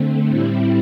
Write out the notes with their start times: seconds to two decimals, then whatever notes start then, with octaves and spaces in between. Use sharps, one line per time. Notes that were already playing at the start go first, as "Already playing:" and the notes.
Already playing: D3 A3 C4
0.27 A2 G3 C4 E4